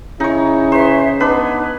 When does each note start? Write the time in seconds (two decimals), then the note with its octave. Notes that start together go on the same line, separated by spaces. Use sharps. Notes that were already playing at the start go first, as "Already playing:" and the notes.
0.20 C#3 D#4 E4 C#5
0.72 G#4 B4 C5 E5
1.20 B3 D4 D#4 G#4 B4